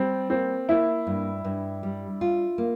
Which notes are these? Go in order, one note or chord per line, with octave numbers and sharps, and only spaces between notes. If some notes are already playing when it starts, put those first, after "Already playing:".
Already playing: G3 C4
A#3 C4
A#3 E4
G2
G2
G3
F4
A#3